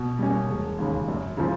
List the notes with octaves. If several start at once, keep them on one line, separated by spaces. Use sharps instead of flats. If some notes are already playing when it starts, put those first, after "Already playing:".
Already playing: B2
G3 A#3 C#4
E1
D#2 C#3
F#2
C#3 F3